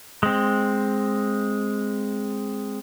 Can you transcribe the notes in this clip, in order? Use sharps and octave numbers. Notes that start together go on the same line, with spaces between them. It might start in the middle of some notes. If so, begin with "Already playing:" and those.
G#3 C4